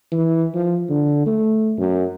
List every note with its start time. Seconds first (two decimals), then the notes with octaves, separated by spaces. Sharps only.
0.12 E3
0.55 F3
0.90 D3
1.26 A3
1.78 F#2